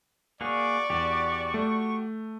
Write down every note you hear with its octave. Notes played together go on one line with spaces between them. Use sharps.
A#3 F#4 G#4 D5 C#6
E2 F#4 G4
A3